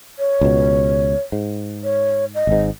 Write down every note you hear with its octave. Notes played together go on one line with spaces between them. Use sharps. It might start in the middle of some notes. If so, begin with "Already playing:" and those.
C#5
C#2 B2
G#2
C#5
D#5
G#1 G#2